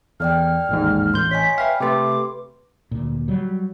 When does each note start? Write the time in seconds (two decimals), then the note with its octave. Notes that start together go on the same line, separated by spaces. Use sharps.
0.20 E2 A4 D5 G5 F6
0.69 A1 D#2 G#2
1.14 A1 C6 G6
1.31 C#5 D#5 G#5 B6
1.58 B4 E5 F5 G5
1.80 C3 A3 G4 B4 C6 D6
2.91 D2 A#2
3.28 F#3 G3